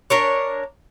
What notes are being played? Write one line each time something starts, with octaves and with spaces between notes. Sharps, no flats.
D4 A#4 C#5